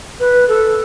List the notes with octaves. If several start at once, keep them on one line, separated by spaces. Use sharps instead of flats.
B4
A4